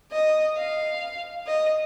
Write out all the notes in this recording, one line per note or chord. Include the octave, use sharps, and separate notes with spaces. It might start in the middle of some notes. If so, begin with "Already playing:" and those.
D#5
F5
D#5